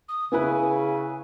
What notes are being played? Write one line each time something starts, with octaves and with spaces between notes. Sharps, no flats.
D#6
C#3 B3 E4 B4 G#5